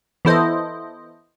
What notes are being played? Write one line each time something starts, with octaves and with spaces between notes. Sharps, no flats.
E3 B3 E4 A4 C5 D#5